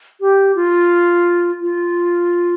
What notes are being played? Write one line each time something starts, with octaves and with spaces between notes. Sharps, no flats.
G4
F4
F4